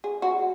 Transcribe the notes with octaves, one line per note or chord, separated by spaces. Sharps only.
G#4
F#4